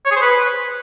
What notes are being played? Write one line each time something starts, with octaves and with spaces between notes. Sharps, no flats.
C#5
G#4
C5
B4